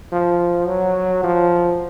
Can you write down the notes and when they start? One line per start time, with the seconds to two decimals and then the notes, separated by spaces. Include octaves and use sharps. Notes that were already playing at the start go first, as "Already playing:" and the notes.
0.12 F3
0.67 F#3
1.23 F3